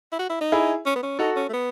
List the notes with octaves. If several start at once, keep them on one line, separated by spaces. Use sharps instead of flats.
E4
F#4
E4
D#4
E4 G#4
C#4
B3
C#4
D#4 F#4 A4
C#4
A3
B3